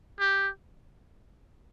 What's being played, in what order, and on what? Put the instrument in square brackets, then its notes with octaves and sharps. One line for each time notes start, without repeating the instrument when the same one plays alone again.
[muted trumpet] G4